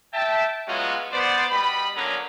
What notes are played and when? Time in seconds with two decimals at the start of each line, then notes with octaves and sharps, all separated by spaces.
0.14 E5 G5 A5
0.67 F#3 G#3 B3 C#4 F4 F#4
1.12 B3 C5 D5
1.51 B2 G3 D#5 B5
1.96 D3 F#3 A#3 B3 C#4 A#5